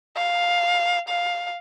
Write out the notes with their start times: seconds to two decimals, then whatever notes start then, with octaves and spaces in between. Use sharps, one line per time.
0.16 F5
1.08 F5